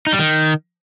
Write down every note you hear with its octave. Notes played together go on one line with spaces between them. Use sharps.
D#4
G3
D#3